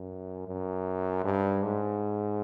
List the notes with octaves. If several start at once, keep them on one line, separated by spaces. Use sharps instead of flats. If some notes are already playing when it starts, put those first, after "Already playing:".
Already playing: F#2
F#2
G2
G#2